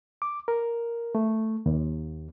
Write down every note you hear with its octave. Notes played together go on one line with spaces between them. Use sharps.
D6
A#4
A3
D#2